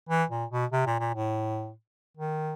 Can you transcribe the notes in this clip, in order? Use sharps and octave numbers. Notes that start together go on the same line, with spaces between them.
E3
A#2
B2
C3
A#2
A#2
A2
D#3